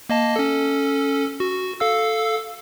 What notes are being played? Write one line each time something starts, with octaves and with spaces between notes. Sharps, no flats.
A#3 D#5 A5
C#4 A4
F#4
A4 F5 E6